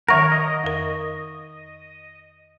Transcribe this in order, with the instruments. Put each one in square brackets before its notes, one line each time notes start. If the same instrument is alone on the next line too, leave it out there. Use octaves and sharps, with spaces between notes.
[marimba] D#3 E5 F#5 [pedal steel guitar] A#4 C#5 [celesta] C#6 A#6
[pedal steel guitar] D#5
[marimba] F2 A#4